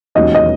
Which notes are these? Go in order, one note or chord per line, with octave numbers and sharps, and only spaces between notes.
E1 D#2 D#3 F#3 C#4 D#5
D#5